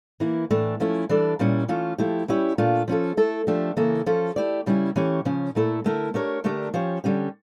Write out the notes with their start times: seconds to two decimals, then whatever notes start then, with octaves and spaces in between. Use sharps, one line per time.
0.20 E3 A#3 E4
0.51 A2 E3 A3 D4
0.80 F3 A3 C#4 E4
1.09 E3 G3 D4 A4 D5
1.39 A#2 G3 C#4 E4
1.68 E3 A3 C#4 F4
1.98 F3 A3 E4 G4
2.28 G3 C#4 E4 G4 C#5
2.58 A#2 A3 D4 F4
2.88 F3 C#4 F4 A4
3.17 A3 E4 A4
3.47 F3 A3 D4 G4
3.77 C#3 E3 A#3 E4 A4
4.06 F3 C#4 F4 A4
4.36 A3 E4 G4 D5
4.66 C#3 G3 C#4 E4
4.96 E3 A3 C#4 G4 C#5
5.25 C#3 F3 C#4
5.55 A#2 A3 E4 A4
5.84 D3 A3 E4 A#4
6.14 A3 D4 G4 A#4 C#5
6.44 D3 A3 D4 G4 A#4
6.74 F3 C#4 G4 C#5
7.04 D3 G3 C#4 G4